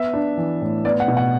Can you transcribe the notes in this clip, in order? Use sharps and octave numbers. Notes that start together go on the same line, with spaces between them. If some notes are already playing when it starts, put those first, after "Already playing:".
Already playing: B3 E5
D4
E3
A2
B3 D5
F#5
B2
F#5